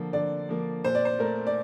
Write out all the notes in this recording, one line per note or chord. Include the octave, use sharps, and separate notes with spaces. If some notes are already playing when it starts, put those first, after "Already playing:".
Already playing: D3 F3 A#3
D3 D5
F3 A#3
A#2 C5
D5
C5
A3 A#4
D5